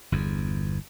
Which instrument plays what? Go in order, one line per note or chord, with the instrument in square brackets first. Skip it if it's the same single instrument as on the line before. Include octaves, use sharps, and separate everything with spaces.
[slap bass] G1 E2